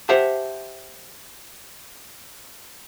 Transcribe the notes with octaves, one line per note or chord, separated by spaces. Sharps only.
G4 C5 E5 F#5 A5